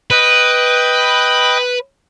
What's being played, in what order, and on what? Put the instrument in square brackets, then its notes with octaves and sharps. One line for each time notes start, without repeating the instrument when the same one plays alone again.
[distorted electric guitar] B4 [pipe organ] D#5 G5 F#6